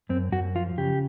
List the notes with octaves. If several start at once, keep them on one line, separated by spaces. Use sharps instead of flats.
F#2 C4
F#2 F#4
F3 F4
C#3 G4